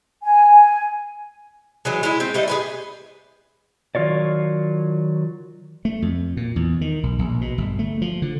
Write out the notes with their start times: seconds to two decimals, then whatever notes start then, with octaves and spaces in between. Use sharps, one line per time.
0.23 G#5
1.85 E3 F#3 G#3
2.03 G#3 E4
2.20 C4
2.34 G3 A3 D#5
2.48 G#4 B4 G#5
3.95 D#3 F#3 F4 C#5 D5
5.85 A3
6.02 F2
6.37 A#2
6.56 E2
6.81 D#3
7.03 B1
7.19 A#1
7.41 B2
7.58 G1
7.79 A3
8.02 F3
8.22 D3